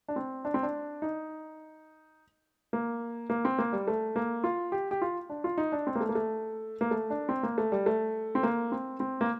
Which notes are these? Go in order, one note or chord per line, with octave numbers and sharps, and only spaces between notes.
D4
C4
D4
C4
D4
D#4
A#3
A#3
C4
A#3
G3
A3
A#3
F4
G4
G4
F4
D4
F4
D#4
D4
C4
A#3
A3
A#3
A3
A#3
A3
D4
C4
A#3
A3
G3
A3
C4
A#3
C4
C4
A#3